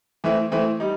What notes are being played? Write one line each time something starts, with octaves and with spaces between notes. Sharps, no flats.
E3 A3 C4 E4
E3 A3 C4 E4
G3 D#4